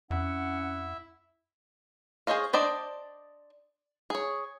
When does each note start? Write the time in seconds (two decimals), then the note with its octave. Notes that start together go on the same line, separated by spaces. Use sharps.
0.10 F2 C#4 E4 E5 F#5
2.27 G#4 C5 C#5 D#5 F5
2.53 D4 C5 D5 D#5 G5
4.10 G#4 C#5